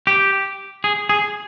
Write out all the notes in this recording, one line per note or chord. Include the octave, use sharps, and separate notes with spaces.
G4
G#4
G#4